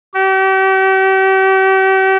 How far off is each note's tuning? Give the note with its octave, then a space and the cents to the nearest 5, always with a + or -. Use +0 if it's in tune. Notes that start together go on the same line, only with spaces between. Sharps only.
G4 -40